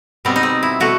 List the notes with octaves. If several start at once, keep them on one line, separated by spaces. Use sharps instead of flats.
B2 G3 B3 C4
D#4
C4
E4
B2 A3 F#4